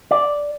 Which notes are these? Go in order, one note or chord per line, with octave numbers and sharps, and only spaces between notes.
D5